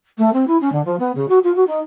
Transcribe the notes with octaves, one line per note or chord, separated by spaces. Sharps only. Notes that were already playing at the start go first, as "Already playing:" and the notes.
A3
C4
E4
C#4
D3
F3
B3
C#3
F#4
F4
F#4
D#4